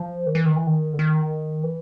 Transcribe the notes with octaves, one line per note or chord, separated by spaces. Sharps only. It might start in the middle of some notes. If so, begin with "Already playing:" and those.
Already playing: F3
D#3
E3
D#3
E3
D#3
D3
D#3
E3